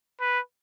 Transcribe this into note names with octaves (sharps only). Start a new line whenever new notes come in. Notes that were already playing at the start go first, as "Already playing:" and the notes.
B4